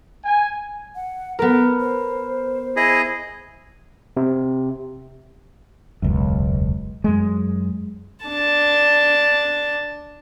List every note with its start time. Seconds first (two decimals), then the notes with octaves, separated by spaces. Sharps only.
0.25 G#5
0.95 F#5
1.39 B3 A4 A#4
1.80 C5
2.76 E4 G#4 D#5
4.17 C3
6.02 E1 C#2 F#2
7.04 F#2 G#3
8.26 D4 A5